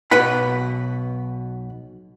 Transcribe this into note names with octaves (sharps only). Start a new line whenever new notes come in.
B1 B2 B4 F#5 B5